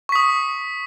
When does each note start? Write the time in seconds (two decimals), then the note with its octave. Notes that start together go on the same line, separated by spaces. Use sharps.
0.09 C#6
0.12 B6
0.15 D#6